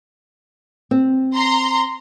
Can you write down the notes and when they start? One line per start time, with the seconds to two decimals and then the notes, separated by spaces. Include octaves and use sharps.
0.91 C4
1.34 A#5 C6